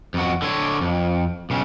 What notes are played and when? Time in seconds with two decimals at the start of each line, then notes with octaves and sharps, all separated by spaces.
0.14 F2 F#4
0.42 D3 C#5
0.81 F2
1.50 B1 C#3